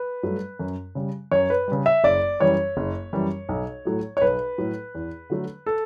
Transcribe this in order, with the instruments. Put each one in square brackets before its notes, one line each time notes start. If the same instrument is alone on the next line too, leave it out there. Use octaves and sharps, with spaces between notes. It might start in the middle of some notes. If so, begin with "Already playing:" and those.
Already playing: [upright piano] B4
G2 F#3 A3
F#2
C#3 G3
F#2 C#5
B4
C#3 G3
E5
F#1 D5
F#2 E3 G3 C#5
F#1
F#2 E3 G3
B1
A2 F#3 A3
C#5
B1 B4
A2 F#3 A3
E2
D3 F#3 A3
A4